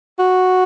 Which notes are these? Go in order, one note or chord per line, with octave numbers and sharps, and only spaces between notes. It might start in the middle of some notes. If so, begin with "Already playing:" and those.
F#4